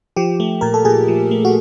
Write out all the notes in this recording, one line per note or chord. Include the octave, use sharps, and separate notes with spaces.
F3 G4
A3
A#2 A#4
A4
A#2 G#4
F3
A3
F#4